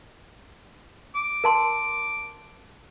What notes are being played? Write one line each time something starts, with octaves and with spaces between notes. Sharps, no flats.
D6
A#4 A5 C6